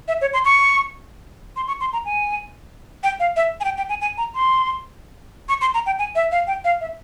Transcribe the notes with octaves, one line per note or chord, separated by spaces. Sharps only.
E5
C#5
C6
C#6
C6
C#6
C6
A#5
G#5
G5
F5
E5
G#5
G5
G5
G#5
G#5
A#5
C6
C#6
C6
A#5
G5
G#5
E5
F5
G5
F5
E5